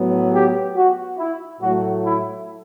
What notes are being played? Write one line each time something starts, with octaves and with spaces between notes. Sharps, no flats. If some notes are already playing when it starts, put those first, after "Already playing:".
Already playing: A2 F#3 B3
G4
F#4
E4
A2 F#3 A3 F#4
E4